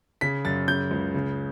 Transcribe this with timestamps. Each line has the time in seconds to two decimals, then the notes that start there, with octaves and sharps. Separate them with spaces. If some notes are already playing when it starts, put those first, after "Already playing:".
0.21 C#3 B6
0.45 F#2 A6
0.68 C#3 G6
0.91 C#2
1.14 C#3